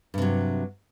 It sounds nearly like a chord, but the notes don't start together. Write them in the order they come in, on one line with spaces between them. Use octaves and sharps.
G2 C3 F#3